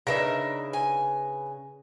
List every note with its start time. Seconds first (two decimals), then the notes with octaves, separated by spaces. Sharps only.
0.07 C#3 D4 D#4 A#4 B4 E5 A#6
0.73 G#5